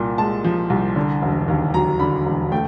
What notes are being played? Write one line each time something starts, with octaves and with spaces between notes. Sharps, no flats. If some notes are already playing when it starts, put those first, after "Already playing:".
Already playing: C2 A#2
G#3 A5
F3
C2
D3
E1
D#2
F#3 A#5
D3 B5
E1
A3 G5